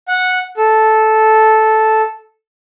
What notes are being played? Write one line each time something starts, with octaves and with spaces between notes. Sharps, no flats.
F#5
A4